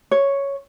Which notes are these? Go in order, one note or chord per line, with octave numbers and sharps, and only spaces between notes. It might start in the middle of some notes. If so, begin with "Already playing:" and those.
C#5